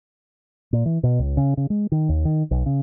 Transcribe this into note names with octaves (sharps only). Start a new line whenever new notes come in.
A#2
E3
B2
C#2
C#3
C#3
G#3
D#3
D#2
D#3
B1
C#3